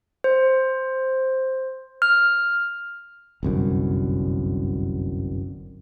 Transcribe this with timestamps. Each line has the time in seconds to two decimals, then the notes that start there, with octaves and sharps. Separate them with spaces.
0.24 C5
2.02 F6
3.43 G1 C2 F#2